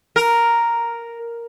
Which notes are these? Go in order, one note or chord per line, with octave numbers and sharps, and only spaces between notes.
A#4